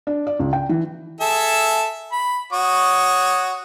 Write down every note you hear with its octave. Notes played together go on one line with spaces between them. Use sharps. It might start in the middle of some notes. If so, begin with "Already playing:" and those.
D4
D5
C#2
G5
E3
G#4 A4 E5
B5
F#4 C#5 D#6